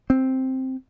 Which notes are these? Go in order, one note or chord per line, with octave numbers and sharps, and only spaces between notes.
C4